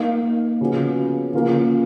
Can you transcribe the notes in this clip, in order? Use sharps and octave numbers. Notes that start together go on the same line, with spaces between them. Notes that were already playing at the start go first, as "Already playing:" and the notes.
Already playing: A#3 D#4 A#4 F5
C#3 F3 B3 F#4
C#3 F3 A#3 F4 A#4